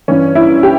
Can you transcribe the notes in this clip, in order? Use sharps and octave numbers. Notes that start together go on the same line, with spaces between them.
G2 E3 C#4
E4
G4